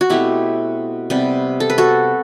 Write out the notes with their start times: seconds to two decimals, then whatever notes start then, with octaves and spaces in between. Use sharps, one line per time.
0.01 F#4
0.10 B2 A3 C4 E4 G4
1.10 C3 G3 B3
1.60 A4
1.70 B4
1.78 F#4 A4